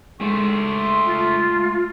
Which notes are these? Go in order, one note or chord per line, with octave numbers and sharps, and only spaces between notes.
G#3 A3 C5 C6 C#6
F4